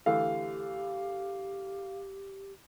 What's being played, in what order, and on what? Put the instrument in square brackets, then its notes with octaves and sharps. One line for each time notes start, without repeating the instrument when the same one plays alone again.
[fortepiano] D3 E3 A3 [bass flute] G4 [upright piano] F5